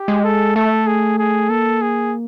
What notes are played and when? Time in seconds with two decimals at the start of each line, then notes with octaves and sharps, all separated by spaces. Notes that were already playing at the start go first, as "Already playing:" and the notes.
Already playing: G4
0.08 G#3
0.24 A4
0.56 A3 A4
0.87 G#4
1.19 G#4
1.50 A#3 A4
1.82 G#4